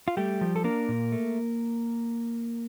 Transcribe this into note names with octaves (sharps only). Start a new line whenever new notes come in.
F4
G3 A3 G4
F3
A4
A#3 D4 A#4
A#2
A3